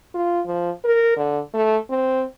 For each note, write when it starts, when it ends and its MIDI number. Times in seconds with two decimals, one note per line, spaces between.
0.14 0.40 65
0.46 0.70 53
0.84 1.15 70
1.17 1.39 50
1.54 1.76 57
1.90 2.23 60